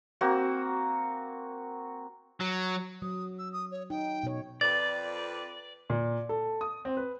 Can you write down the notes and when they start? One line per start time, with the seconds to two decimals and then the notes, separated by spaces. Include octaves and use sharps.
0.21 A#3 C4 F#4
2.40 F#3
3.02 F#3 D#6
3.39 E6
3.53 D#6
3.71 C#5
3.90 D#4 G5
4.23 B2 C#5
4.61 F2 B4 D5 A6
5.90 A#2
6.29 A4
6.61 D#6
6.85 C4
6.97 B4